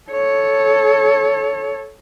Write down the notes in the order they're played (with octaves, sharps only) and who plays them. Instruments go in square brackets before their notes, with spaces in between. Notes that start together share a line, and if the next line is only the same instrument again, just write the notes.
[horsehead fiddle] A4 C#5